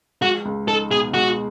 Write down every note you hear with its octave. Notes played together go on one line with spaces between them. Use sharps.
G#3 F#4
C#2
D#4 A4
B2 G#4
G#3 F#4